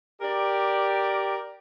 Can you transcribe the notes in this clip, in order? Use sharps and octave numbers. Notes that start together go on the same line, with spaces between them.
G4 A#4 D5